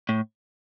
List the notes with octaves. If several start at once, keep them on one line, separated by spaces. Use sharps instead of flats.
A2